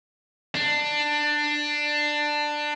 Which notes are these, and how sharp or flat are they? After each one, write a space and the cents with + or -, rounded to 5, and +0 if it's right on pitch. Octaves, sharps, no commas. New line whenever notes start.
D4 +15